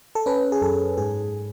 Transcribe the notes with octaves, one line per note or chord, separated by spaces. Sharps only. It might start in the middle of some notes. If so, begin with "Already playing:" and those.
A4
C#4 B4
G#4
F#2 A4
G#2 G#4